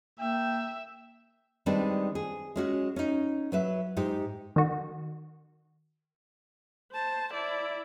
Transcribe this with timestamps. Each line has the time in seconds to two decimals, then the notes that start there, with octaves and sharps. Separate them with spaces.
0.20 A#3 E5 G5
1.66 D#3 G3 G#3 C4 D4 B4
2.15 G#4
2.56 G#3 C#4 F#4
2.96 C#4 D#4
3.52 F#3 B4 E5
3.97 G#2 D#4 G4
4.56 D#3 F#4
6.92 C5 A5
7.34 E4 D5